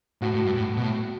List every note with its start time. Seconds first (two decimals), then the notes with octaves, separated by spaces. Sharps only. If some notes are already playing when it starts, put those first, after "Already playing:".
0.22 A2 F#4
0.34 A2
0.45 G2
0.56 A2
0.77 B2
0.83 A2